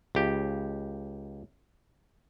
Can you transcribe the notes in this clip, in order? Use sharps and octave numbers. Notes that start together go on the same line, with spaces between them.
C#2 G4